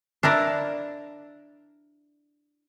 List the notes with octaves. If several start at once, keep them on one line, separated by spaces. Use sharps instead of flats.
D4 E4 A#4 D5